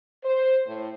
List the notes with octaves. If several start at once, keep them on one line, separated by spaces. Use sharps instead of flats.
C5
A2